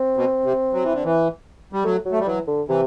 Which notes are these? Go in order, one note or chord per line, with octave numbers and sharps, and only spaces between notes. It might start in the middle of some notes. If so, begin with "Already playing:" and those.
Already playing: C4
B2
C3
F#3
E3
D3
E3
G3
F#3 A3
F#3
A3
G3
E3 F#3
D3
C3 E3